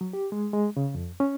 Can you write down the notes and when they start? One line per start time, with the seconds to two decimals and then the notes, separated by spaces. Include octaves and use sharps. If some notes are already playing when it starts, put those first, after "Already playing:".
0.01 F#3
0.13 G4
0.32 G#3
0.53 G#3
0.77 C#3
0.95 F2
1.20 C#4